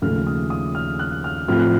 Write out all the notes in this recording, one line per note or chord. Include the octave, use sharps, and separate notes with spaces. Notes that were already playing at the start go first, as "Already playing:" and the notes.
D#2 C#3 F3 A3 F6
D#6
D#6
F6
F#6
F6
A2 F3 C4 F4 F6
F#6